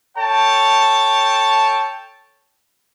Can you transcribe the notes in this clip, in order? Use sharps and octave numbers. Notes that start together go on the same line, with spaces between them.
A4 C#5 G5 A5